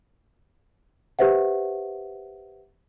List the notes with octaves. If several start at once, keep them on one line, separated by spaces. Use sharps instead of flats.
G4 B4 C5 E5 F#5